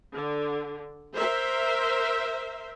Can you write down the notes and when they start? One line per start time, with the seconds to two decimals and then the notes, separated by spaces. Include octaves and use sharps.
0.13 D3
1.15 A#4 C5 E5